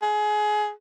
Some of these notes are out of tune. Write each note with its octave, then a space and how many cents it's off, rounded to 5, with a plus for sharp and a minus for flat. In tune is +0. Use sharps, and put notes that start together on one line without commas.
G#4 +20